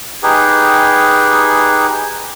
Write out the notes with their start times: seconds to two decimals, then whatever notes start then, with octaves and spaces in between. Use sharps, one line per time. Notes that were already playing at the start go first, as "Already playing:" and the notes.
0.23 D#4 G4 G#4 B4